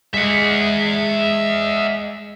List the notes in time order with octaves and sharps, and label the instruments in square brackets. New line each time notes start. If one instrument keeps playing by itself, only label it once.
[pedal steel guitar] G#3 [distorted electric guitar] E5 F#5